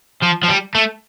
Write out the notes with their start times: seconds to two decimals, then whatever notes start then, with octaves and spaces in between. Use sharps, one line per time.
0.22 F3
0.43 F3
0.48 G3
0.75 A3